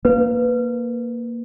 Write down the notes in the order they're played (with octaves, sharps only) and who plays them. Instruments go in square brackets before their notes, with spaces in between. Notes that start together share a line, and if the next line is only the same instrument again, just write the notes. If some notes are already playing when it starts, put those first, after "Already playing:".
[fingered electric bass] A#3 [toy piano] B4